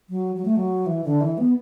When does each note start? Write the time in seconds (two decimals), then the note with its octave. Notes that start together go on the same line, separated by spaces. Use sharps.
0.09 F#3
0.36 F#3
0.45 A3
0.56 F#3
0.86 E3
1.04 D3
1.21 E3
1.38 B3